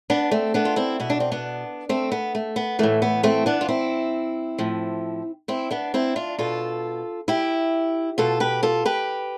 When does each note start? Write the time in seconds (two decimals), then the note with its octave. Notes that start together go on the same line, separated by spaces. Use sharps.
0.10 B3 D4
0.31 A3 C4
0.54 B3 D4
0.65 F4
0.76 C4 E4
1.00 B2 E4
1.10 D4
1.20 C4
1.32 B3 D4
1.89 A3 C4
2.12 B3
2.35 A3
2.56 B3
2.79 A2 E3 A3
3.02 B3
3.23 A3 C4
3.46 B3 D4
3.61 F4
3.68 C4 E4
4.58 A2 F3
5.48 C4 E4
5.71 B3 D4
5.94 C4 E4
6.16 D4 F4
6.39 B2 F4 A4
7.28 E4 G4
8.18 B2 F4 A4
8.40 G4 B4
8.63 F4 A4
8.85 G4 B4